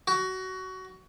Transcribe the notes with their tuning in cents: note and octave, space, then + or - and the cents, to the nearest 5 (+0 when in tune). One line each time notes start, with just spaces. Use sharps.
F#4 +20